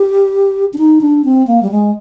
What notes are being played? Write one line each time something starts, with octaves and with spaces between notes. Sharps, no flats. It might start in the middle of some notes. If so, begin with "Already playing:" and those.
Already playing: G4
D4
D#4
D4
C4
A#3
G3
G#3